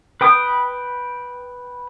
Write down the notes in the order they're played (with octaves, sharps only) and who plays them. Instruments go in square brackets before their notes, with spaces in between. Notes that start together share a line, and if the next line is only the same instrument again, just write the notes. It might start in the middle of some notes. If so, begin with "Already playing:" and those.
[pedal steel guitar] B4 G5 D#6